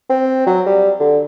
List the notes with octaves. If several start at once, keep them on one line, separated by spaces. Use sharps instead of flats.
C4
F#3
G3
D3